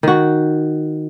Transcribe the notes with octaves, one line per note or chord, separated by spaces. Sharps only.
D#3 F#4